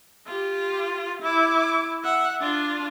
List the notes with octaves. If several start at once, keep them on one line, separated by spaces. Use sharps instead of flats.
F4 G4
E4 D6
E5 F#5
D4 F4